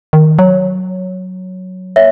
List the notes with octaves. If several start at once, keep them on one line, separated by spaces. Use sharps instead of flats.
D#3
F#3 C#5
A#3 C#5 E5